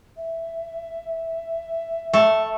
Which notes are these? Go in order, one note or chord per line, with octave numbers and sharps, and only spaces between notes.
E5
A3